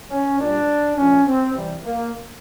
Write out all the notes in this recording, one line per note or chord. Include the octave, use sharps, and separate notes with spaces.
C#4
A#2 G3 D4
A#2 F3 A3 C#4
C4
C3 E3 G3
A#3